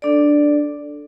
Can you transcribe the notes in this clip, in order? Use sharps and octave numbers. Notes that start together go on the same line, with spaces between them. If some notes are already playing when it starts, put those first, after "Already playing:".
D4 A4 D5